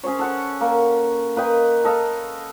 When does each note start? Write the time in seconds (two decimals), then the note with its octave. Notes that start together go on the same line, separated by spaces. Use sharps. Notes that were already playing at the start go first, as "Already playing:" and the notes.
0.04 C#4 G#4 C5 C#5
0.19 A4 F#5 C#6
0.61 A#3
1.36 A#3 B4 D#5 G5
1.84 A4 D#5 F5